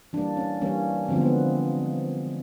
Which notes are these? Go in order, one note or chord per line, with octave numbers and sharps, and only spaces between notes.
E3 G3 A#3 D4
C#4
E3 G3 A#3 C#4
D3 F3 G#3 B3 C4
B3